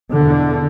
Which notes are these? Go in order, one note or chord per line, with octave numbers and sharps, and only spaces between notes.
E2 B2 D3